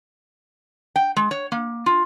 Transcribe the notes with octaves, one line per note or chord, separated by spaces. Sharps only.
G5
G#3
C#5
A#3
F4